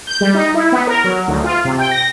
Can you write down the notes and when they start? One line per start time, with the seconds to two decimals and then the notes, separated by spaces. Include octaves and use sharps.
0.07 G6
0.21 G3
0.35 D#4
0.54 E4
0.72 B3
0.87 A#4
1.04 F#3
1.28 D2
1.44 F4
1.65 C3
1.79 G5
1.91 A#6